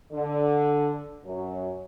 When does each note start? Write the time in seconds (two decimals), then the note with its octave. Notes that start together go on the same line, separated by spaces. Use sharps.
0.12 D3
1.25 F#2 F#3